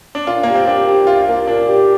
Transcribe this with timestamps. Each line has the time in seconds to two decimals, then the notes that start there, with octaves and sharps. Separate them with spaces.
0.15 D4
0.27 A#2 F4
0.43 A#3 G4
0.55 C4
0.67 D4 G4
0.87 G4
1.07 C2 F4
1.27 A#3
1.47 A#2 D4
1.68 G4